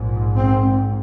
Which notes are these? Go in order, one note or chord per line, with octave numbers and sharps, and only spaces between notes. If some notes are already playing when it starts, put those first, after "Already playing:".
Already playing: A#1 G#2
C4